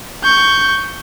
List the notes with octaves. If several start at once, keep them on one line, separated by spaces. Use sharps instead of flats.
C#6 G6